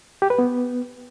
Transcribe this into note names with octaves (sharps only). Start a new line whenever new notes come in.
G4
B4
B3